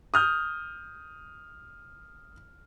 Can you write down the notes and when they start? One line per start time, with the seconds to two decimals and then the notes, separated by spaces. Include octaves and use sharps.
0.14 D#6 F6 G6